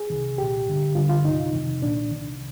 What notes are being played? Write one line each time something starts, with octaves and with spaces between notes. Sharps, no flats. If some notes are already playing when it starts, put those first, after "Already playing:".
Already playing: G#4
C2 C3 D#3
C2 A#2 G4
G2 D3
G2 D3 F4
F4
C2 C3 D#3 D#4
F2 C3 D#3
C2 A#2 D4
C2 C3 D#3